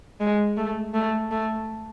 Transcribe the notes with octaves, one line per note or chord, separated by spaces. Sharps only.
G#3
A3
A3
A3